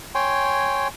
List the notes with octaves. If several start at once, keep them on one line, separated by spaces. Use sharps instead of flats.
C#5 G5 G#5 C6